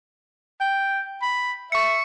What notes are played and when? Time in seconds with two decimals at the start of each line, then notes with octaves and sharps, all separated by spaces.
0.61 G5
1.22 B5
1.72 E5 C#6 C#7